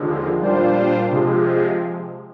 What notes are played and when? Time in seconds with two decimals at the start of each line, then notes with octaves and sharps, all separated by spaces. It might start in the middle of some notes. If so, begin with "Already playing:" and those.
Already playing: D#2 D3 F3 G#3
0.41 A#2 G3 D4 F4 C5
1.10 C3 F3 G#3